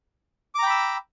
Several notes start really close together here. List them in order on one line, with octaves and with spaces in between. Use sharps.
D6 A#5 G5 B5 E6